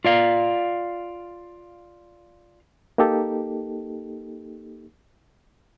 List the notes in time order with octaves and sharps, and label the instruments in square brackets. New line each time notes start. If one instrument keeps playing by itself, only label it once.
[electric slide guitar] F4 D5 F5
[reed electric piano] A#3 D#4 G4 A4